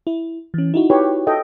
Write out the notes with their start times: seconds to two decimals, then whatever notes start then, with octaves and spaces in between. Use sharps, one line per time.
0.07 E4
0.54 E3 C#4
0.74 D#4 E4 F#4
0.90 G4 B4 C#5
1.27 A4 D#5 G5